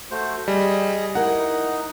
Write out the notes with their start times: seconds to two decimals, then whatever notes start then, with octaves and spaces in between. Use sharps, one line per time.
0.11 A3 F#4 C5
0.48 G3 G#4 D#5
1.15 D#4 E4 A#4 F#5